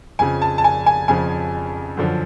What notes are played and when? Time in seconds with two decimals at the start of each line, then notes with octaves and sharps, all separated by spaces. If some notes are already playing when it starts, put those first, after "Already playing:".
0.19 F2 C#3 F3 G#5
0.42 A5
0.58 A5
0.64 G#5
0.86 G#5
1.08 F2 C#3 F3 G#5
1.97 F#2 D3 F3